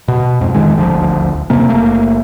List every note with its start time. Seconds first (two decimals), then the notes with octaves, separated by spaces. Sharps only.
0.08 B2
0.41 F2 G#2
0.55 D1 F2 D#3 G#3
0.77 D#1 G#1 D2 F3
1.50 F2 C3 A#3
1.68 F#1 A3 A#3